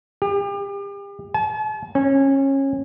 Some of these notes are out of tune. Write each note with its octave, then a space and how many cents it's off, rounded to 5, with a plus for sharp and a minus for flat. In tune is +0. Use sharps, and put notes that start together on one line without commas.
G4 +35
A5 -45
C#4 -25